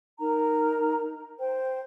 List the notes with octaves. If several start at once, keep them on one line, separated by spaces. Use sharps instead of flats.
D#4 A#4 A#5
C5 G5